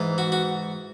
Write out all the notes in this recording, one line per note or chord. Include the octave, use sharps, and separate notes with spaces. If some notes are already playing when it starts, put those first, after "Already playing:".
Already playing: G#2 E3
F#4
F#4